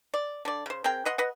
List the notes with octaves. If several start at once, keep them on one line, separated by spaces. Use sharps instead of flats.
D5
D3 D5
C#3 C5
C4 G#4 A#4 G5
B4 D#5 F#5 C6
B4 D#5 F#5